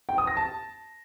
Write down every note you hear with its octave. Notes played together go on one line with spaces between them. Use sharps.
G5
D#6
A#6
A5